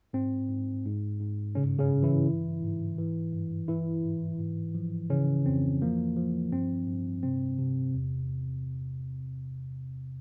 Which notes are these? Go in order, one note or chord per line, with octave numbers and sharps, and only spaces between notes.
G#2 C4
G#2
G#2
G#2
G2 C#3 C#4
C#3 C#4
G2
E3 E4
E3
G#2
E3
G2
E3 E4
G#2
G#2
F3
C#3 E3 C#4
F2 C4
F3 A#3
F3
G2 C4
G2
C3 C4
C3
E2